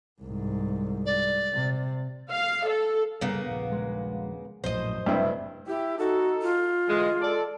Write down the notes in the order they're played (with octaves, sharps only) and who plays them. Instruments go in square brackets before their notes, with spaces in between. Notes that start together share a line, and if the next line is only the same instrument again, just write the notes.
[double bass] C2 G#2
[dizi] D5
[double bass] C3
[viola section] F5
A4
[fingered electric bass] C2 G2 [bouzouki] C#3 A#3 B3
[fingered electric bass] D#1 A#1
[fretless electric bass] G#3
[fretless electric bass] A#1 A2 [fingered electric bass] F#2 [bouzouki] C5 D#5
[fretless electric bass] F#1 G3 A3 [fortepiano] G2 C3 E4
[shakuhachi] E4 [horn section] G4
[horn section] D#4 A4 [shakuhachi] F#4
[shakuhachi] F4
[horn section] D3 E3 G#3
A4 D5